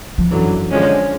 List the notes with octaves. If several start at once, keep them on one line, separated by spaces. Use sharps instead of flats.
F3
F#2 D3 E3 F#3
D3 F3 G#3 C#4